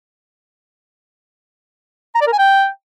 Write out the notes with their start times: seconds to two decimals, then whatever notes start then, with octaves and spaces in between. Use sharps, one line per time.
2.15 A#5
2.21 D5
2.27 A#4
2.33 G#5
2.39 G5